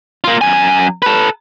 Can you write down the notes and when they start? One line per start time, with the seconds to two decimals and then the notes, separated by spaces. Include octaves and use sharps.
0.24 A#3 F4
0.41 F#2 G#5
1.02 A4 B4